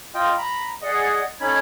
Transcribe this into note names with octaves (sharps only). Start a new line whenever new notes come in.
F4 D#5 G5
A#5 B5
G#4 D5 D#5 F#5
C#4 D#4 A4 B5 G#6